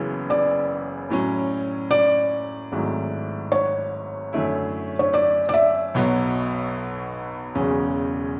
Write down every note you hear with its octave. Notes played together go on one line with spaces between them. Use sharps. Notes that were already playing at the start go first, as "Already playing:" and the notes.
Already playing: F#1 F#2 C#3 E3 B3
D5
A2 F#3 C#4
D5
G#1 G#2 F#3 A3 E4
C#5
F#2 D3 A3 E4
C#5
D5
D5
E5
B1 B2 F#3
E1 E2 C#3 F#3 C#4